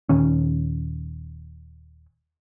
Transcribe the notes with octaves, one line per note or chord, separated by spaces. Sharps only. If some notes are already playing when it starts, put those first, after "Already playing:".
D#1 D#3 C#4